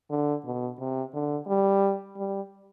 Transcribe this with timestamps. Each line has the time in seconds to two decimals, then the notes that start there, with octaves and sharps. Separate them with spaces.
0.10 D3
0.45 B2
0.79 C3
1.14 D3
1.47 G3
2.17 G3